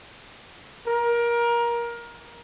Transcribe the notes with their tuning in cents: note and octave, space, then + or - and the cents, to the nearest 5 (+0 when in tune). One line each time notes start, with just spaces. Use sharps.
A#4 +20